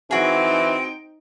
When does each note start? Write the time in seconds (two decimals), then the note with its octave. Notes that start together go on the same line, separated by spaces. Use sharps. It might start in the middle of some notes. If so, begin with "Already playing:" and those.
0.11 E3 C4 D#4 F#4 G#4 G5